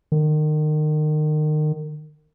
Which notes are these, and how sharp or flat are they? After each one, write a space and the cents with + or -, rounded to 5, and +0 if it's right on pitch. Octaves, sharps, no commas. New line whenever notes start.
D#3 -30